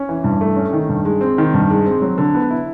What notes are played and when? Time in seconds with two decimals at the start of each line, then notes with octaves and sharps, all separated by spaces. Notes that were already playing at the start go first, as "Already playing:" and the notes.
Already playing: C#4
0.09 E3
0.24 G2
0.41 A3
0.56 C#4
0.73 D#3
0.89 G2
1.05 G#3
1.21 C4
1.38 D#3
1.54 G2
1.70 G#3
1.86 C4
2.02 F#3
2.18 D3
2.34 B3
2.51 E4